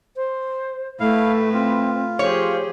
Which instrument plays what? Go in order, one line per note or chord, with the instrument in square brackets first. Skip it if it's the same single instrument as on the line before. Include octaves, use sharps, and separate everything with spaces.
[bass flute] C5
[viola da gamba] A2 B4 [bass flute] A3 [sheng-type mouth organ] E4 F5
[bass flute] C4 [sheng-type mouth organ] F4
[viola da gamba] F3 G4 G#4 [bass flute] C5 [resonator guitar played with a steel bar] C#5